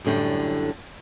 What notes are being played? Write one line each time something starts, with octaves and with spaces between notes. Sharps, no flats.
F#2 A2 D3 G3